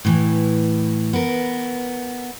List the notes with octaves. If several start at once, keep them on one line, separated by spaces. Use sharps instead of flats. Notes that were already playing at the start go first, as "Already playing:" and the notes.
A2 E3
B3 A#4